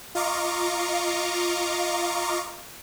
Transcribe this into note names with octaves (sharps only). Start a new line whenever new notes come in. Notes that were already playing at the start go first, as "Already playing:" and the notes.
F4 D#5 F5 A#5 C#6 D6